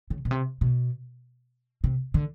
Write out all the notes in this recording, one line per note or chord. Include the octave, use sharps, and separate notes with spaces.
C#3
B2
C3
B2
C3
D3